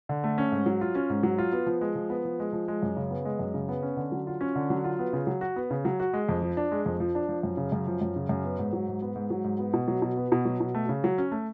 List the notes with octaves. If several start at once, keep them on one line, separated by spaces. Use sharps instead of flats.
D3
A3
C#4
G#2
F#3
F4
C#4
G#2
F#3
F4
B3
F3
G#3
F3
B3
F3
G#3
F3
G#3
F#2
C#3
B3
G#3
F#2
C#3
B3
C#4
D3
F#3
F4
C#4
D3
F#3
F4
B3
C#3
F#3
F#4
B3
C#3
F#3
F#4
G#3
F2
F3
D4
G#3
F2
F3
D4
F3
F#2
C#3
F#2
F3
F#2
C#3
F#2
B3
G#2
F#3
G#2
B3
G#2
F#3
G#2
B3
B2
F#3
B2
B3
B2
F#3
B2
A3
C#3
F#3
C#4
A3